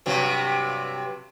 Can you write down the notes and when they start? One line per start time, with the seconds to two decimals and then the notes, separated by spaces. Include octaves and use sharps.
0.06 G2 C3 F#3